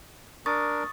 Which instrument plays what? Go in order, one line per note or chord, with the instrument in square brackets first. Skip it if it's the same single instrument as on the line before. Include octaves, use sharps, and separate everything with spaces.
[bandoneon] D4 A#4 [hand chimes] C#6 D#6 A6